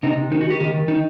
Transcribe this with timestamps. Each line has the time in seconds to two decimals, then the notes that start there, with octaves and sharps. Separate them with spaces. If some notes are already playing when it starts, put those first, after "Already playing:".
0.03 C3 D#4
0.17 C3
0.31 D#3 D#4
0.41 F#4
0.46 D#3 G4
0.60 D#3 G4
0.74 D#3
0.88 D#3 D#4